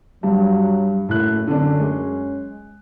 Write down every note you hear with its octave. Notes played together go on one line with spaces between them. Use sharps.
G2 F#3
F#1 A2 F#6
F#2 D3 C#4 D4
G#3